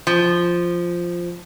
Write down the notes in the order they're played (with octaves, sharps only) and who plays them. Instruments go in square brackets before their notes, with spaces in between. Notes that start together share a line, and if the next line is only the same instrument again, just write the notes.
[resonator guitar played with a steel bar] F3